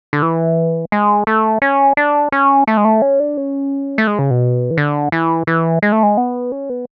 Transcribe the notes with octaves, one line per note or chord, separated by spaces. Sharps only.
D3
E3
G#3
A3
C#4
D4
C#4
A3
G#3
A3
C#4
D4
C#4
A3
G#3
C#3
B2
E3
D3
E3
E3
G#3
A3
G#3
B3
C#4
B3